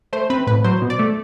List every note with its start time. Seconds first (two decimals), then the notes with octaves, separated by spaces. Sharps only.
0.13 A3 C5
0.30 C4 B4
0.47 A2 B4
0.64 F#3 C5
0.82 B2
0.90 D5
0.99 A3